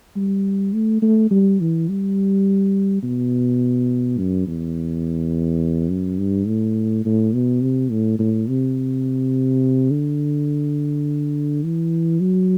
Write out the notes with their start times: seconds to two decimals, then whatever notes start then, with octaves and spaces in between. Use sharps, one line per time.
0.16 G3
0.73 A3
1.02 A3
1.31 G3
1.60 E3
1.89 G3
3.03 B2
4.18 F#2
4.47 E2
5.90 F#2
6.18 G2
6.47 A2
7.05 A2
7.33 B2
7.62 C3
7.91 A2
8.19 A2
8.48 C3
9.91 D3
11.64 E3
12.20 F#3